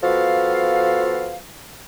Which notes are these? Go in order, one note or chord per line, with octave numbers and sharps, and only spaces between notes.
F3 B3 F#4 A4 F5